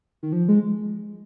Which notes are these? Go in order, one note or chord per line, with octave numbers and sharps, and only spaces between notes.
D#3
F3
G#3